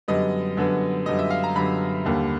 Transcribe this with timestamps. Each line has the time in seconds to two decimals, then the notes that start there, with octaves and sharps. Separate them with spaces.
0.08 F#2 D3 G3 B3 D#5
0.57 F#2 D3 G3 B3
1.06 F#2 D3 G3 B3 D#5
1.19 E5
1.30 F5
1.44 A#5
1.55 F#2 D3 G3 B3 B5
2.05 D#2 D3 G3 A#3